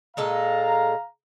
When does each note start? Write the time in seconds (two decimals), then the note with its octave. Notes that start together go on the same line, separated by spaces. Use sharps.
0.17 A#2 G#3 A4 F5 A#5